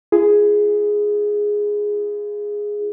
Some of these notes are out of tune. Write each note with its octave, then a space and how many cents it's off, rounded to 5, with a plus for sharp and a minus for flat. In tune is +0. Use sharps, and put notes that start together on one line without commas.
F4 -40 G#4 +0